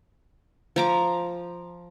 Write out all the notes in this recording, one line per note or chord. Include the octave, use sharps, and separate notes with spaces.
F3 A#5 D6